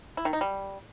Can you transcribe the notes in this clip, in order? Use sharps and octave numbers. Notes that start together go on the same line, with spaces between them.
E4
D#3
D#4
G3